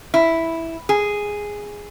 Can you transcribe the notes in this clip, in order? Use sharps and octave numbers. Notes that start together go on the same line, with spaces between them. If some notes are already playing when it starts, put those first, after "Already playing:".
E4
G#4